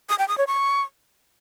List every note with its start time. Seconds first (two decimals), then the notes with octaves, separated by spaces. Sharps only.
0.09 D#6
0.19 G5
0.28 D#6
0.38 C#5
0.47 C#6